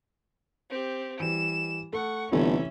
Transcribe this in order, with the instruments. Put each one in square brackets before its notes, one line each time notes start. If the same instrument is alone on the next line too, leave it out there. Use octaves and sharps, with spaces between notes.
[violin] C4 G4
[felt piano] E3 G3 [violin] E7
[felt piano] A3 [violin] F#5 C#6
[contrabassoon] G1 [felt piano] C3 E3 A3 [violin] C#4 E5